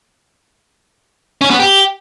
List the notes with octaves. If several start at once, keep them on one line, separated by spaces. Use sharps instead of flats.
C#4
B3
G4